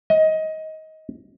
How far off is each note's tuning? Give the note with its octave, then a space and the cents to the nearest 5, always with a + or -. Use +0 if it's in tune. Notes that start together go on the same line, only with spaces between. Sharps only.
D#5 +20